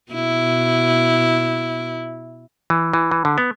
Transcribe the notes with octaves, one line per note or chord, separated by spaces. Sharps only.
B2 E4
E3
E3
E3
D3
B3